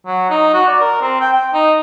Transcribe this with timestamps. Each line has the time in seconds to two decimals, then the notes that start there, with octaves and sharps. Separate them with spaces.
0.06 F#3
0.30 D#4
0.53 F#4
0.67 D5
0.81 A#4
1.01 C4
1.21 G5
1.33 G5
1.53 D#4